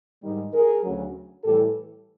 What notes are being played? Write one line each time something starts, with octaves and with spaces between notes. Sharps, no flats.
G#2 D#3 G3
G#4 A#4
D2 C#3 F#3
A2 E3 G3 G4 A4